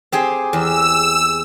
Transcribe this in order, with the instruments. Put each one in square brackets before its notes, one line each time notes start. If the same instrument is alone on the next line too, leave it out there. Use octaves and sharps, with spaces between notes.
[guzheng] C4 G4 G#4
[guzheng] E2 [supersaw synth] E6